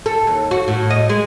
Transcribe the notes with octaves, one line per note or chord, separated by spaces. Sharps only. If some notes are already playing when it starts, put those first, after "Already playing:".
A4
D#2
F#4
A2
D#5
G#3